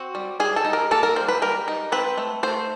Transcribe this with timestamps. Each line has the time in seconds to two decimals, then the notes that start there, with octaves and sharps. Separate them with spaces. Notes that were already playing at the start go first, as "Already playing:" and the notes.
Already playing: C4 F#4
0.15 G3
0.40 G3 G#4
0.56 A4
0.65 D#4
0.73 A#4
0.91 A#3 A4
1.03 A#4
1.16 G3 C5
1.28 B4
1.42 G3 A#4
1.68 D#4
1.92 C4 B4
2.18 A3
2.43 A3 C5